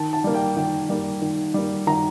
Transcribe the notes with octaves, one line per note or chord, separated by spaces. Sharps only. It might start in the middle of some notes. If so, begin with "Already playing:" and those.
Already playing: D#3 A5
A5
G3 A#3
G5
D#3 G5
G3 A#3
D#3
G3 A#3
D#3 A#5